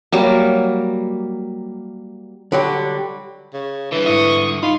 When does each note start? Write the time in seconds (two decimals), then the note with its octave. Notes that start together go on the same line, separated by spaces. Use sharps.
0.12 F#3 G3 A#3
2.52 D3 F#3 G3
3.53 C#3
3.92 G2 D3 E3
4.06 G#2 E4 E5 C#6 D#6
4.63 D#4 F4 B5